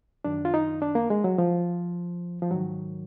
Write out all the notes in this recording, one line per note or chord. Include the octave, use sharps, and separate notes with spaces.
F#2 D#3 D4
F4
D#4
D4
A#3
G#3
F#3
F3
F3
G#2 D#3 F#3